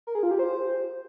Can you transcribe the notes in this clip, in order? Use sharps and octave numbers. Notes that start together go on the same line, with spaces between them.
A#4
G#4
F4
G4
C5